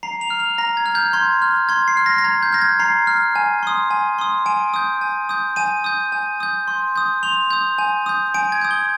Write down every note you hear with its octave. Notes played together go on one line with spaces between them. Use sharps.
A#5 C7
F7
F6
F7
A#5 A#6
G#6
F6
G6
C6 G#6
F6
C6 G#6
C7
F6
A#6
A#6
A#5 G#6
G6
F6 A#6
G#6
A#5 C7
F6
G#5
C6 D#6
G#5
C6 D#6
G#5 D7
D#6 G6
G#5
D#6 G6
G#5 D#7
D#6 G6
G#5
D#6 G6
C6
D#6 G6
C6 F7
D#6 G6
G#5
D#6 G6
G#5 D7
G#6
D#6 G6
G7